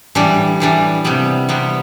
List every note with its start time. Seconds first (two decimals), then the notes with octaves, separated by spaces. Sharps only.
0.15 A2 E3 G3 D4
0.60 A2 E3 G3 D4
1.04 C3 G3 B3
1.49 C3 G3 B3